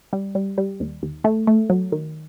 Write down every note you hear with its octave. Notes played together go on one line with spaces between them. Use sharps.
G3
G3
G3
D#2
D#2
A3
A3
F#3
D#3